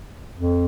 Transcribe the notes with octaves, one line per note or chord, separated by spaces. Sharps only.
F2